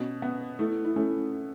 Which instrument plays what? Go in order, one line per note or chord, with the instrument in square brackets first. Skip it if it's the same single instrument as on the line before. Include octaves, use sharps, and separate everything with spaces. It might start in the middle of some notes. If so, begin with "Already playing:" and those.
Already playing: [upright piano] B2 [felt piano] C#4
[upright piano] B3
[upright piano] A3 [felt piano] E4
[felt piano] E4
[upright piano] A3 [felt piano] C#4